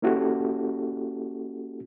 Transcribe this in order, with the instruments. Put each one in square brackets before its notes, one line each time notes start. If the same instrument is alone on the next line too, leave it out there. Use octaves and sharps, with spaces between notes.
[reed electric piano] A#3 C#4 E4 F#4 G4 A4